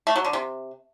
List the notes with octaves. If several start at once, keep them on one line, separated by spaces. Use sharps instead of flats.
A3
F#3
D3
C3